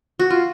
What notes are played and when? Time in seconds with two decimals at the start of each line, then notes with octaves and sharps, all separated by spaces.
0.19 F#4
0.30 F4